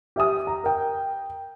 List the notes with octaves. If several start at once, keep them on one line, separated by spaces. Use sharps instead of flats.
G4 E5 G#5 D#6
A#5
A#4 G5